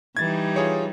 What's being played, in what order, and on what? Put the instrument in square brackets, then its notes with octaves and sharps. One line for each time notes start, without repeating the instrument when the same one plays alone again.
[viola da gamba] E3 G3 D#4 [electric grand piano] G#6 A6
[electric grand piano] F4 G#4 C#5